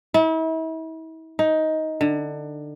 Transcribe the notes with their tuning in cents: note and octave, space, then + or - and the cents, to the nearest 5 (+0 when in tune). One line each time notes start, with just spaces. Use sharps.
E4 -40
D#4 +15
D3 +20